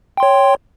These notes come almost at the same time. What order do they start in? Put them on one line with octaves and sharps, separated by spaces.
G5 C6 C#5